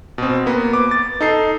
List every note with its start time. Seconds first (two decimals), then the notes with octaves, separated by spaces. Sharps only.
0.18 B2 C4
0.46 A#3 B3
0.73 D6
0.91 A6
1.21 D#4 A4 C7